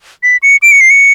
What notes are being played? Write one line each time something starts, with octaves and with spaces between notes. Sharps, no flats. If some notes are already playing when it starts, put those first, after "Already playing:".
B6
C#7
D7
C#7
C7
C#7